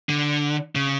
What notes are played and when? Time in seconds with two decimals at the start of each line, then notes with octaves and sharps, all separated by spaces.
0.09 D3
0.75 C#3